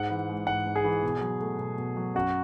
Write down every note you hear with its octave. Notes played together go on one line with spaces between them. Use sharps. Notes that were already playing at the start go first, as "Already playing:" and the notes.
Already playing: G#2 F#5
E3
G#3
G#2 F#5
G#2
G#4
E3
B2
F#3
A3
B2
B2
F#3
F#2 F#4